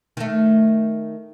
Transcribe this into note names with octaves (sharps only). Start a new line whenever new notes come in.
D#3 A3